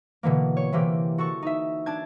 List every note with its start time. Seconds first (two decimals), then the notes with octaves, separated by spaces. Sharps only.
0.23 B2 D3 E3 A#3
0.57 C#5
0.72 C3 E3 A#3 G4
1.18 F#4 A4 C#6
1.43 D#4 E5
1.86 D4 A5 G#6